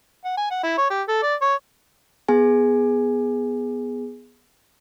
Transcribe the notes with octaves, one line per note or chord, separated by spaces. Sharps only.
F#5
G#5
F#5
E4
C#5
G4
A4
D5
C#5
B3 G#4 G#5